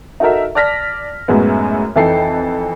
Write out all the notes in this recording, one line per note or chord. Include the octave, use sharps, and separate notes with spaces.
D#4 F#4 A4 A#4 E5
D5 A5 F6 A#6 B6
F#2 A2 G#3 B3
F2 E3 D#4 A4 G5 C7